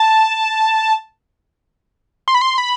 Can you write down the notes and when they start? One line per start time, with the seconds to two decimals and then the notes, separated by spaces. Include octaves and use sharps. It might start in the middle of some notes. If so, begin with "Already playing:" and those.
Already playing: A5
2.28 C6
2.35 B5
2.42 C6
2.58 B5